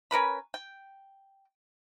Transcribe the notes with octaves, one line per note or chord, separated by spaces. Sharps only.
C#4 A#4 B4 B5
G5